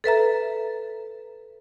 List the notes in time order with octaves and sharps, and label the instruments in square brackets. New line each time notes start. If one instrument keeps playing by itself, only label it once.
[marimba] A4 B4 E5 A#5